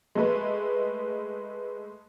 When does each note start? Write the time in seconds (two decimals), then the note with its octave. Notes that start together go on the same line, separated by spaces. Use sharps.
0.15 G#3 A3 B4